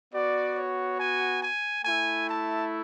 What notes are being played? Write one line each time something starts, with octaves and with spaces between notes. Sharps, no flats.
B3 F#4 D5
C#5
G#5
G#5
A3 E4 G#5
A5